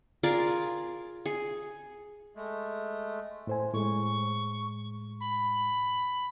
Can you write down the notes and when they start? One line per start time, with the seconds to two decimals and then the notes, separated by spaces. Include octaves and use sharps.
0.23 F4 G#4 A#4 D5
1.26 G#4
2.36 G#3 A3
3.47 A2 C5 G#5
3.74 A2 G#3 C#6
5.21 B5